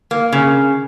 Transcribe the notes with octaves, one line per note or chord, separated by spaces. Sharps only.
A#3
C#3